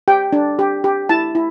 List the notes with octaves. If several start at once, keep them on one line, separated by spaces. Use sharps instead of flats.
G4 G5
D4
G4
G4
E4 A5
E4